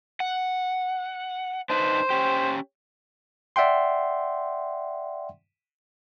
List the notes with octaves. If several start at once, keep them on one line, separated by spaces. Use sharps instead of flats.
F#5
D4 D#4 B4 C5
C#4 G4
D5 E5 F#5 G5 C6